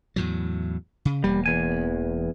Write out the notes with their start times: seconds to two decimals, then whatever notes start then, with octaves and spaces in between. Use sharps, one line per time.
0.16 E2 A2 F#3
1.05 C#3
1.24 E1 G3 A#3
1.46 E2 G#5